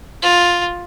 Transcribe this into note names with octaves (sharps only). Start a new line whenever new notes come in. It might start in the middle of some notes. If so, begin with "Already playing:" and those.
F4